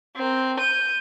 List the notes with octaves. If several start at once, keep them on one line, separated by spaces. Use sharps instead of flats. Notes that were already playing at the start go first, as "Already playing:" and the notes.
C4 A#4
G6 D#7